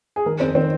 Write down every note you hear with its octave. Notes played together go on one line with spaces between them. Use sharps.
G#4
D#3 A#4
F2 C4
D#3 C4